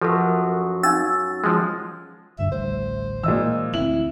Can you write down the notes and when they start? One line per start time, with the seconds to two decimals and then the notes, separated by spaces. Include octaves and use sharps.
0.02 F#2 F3 F#4 G4 A4 B4
0.83 C#4 D#4 F5 E6 A6
1.44 F3 G#3
2.39 D2 G2 D3 E5
2.52 A1 D2 G3 C5
3.23 A#2 E3 G#3 D#5 E6
3.74 D2 C4 E4 F#7